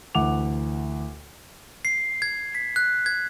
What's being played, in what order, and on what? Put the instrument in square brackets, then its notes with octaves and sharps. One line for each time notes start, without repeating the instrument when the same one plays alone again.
[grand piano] D2 E3 F#5 D6 F7
[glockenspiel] C7
G#6
B6
F#6
G#6